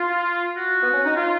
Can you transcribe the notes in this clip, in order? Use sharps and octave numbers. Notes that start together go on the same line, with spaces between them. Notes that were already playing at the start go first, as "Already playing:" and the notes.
Already playing: F4
F#4
B3
C#4
D#4
F4